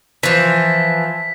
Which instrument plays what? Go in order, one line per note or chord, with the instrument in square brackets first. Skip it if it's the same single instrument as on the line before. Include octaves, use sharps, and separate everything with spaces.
[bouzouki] E3 F3 [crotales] B6